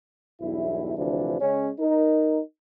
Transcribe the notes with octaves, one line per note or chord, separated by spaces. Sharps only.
B1 E2 G2 E4
D2 C3 E3 F3 D4
C#3 G#3 C#4
D#4 A#4